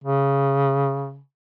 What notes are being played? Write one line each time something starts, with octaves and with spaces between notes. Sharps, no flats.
C#3